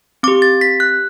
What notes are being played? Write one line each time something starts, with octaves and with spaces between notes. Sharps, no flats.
C4 G4 D6
A6
B6
F#6